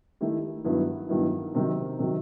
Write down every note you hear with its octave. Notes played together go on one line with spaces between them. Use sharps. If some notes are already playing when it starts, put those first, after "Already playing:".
D#3 A3 E4 G4
G2 D#3 F#3 B3 E4
G2 D#3 F#3 B3 E4
C3 D#3 F#3
C3 D#3 F#3